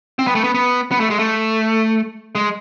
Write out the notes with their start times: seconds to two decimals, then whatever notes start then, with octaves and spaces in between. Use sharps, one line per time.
0.19 C4
0.27 B3
0.35 A3
0.44 B3
0.54 B3
0.91 B3
1.00 A3
1.10 G#3
1.19 A3
2.35 G#3